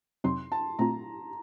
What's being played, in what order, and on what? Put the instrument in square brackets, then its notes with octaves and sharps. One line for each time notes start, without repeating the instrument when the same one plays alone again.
[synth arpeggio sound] F2 C3 F#3 C4 D#4 [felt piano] C6
[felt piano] A5
[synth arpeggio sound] A#2 A3 C4 F4 [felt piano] A#5